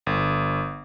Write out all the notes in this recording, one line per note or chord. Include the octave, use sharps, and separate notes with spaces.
G1